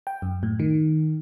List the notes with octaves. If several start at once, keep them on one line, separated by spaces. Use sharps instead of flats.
G5
F#2
A2
D#3